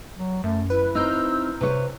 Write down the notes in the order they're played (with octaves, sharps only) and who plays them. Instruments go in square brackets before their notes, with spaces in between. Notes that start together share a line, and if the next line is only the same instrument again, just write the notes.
[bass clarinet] F#3
[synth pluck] F#2 [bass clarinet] A3
[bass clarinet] E4 [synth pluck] B4
[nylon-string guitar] C4 D#4 [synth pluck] A#5 F6 G6 [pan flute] E6
[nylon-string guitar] C3 C#5 [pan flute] B4